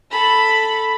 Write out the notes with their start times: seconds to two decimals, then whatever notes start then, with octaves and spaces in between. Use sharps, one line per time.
0.11 A4 B5